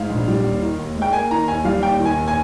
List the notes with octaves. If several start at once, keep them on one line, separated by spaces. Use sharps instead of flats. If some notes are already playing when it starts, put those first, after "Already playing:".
Already playing: G#2 F5
A#1
G3
D#2
D#3
D#2
G#3
G5
A#3 G#5
D#3 A#5
D#2 G#5
G3 F5
D#2 G5
D#3
G#5
D#2
G#5